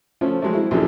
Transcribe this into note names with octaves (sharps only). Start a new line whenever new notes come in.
F3 A3 C#4
F#3 G#3 A3
C4 E4
A#1 F#2 E3 F#3 G#4 A4